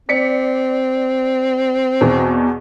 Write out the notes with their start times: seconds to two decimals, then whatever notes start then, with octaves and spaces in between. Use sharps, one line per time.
0.09 C4 D5 B6 C#7
2.01 E2 B2